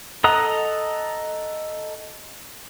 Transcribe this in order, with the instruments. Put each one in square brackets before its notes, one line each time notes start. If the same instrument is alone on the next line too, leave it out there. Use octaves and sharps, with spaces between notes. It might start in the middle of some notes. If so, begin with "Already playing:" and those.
[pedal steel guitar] A4 D#5 F#5 A#5 D#6